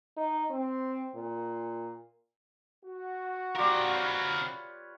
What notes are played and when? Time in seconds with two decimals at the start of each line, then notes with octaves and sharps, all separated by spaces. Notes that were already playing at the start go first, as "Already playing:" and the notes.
0.17 D#4
0.51 C4
1.15 A#2
2.85 F#4
3.55 C4 F4 G4 A#4 D5
3.93 B4 C#5